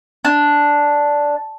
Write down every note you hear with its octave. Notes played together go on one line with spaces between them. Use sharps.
D4